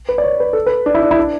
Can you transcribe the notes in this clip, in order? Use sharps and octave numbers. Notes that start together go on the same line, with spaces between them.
B4
D5
C#5
B4
A4
B4
D4
E4
D4
E4
D4